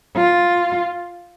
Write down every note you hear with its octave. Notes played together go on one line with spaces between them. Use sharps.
F4